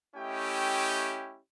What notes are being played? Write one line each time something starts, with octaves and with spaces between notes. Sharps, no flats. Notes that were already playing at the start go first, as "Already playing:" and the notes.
A3 C#4 E4 G4 D#5 G5